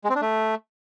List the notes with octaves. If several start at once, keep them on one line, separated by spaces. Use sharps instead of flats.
G#3
C4
D4
A3